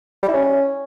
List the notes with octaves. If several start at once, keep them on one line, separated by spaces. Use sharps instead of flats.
G3
E4
C#4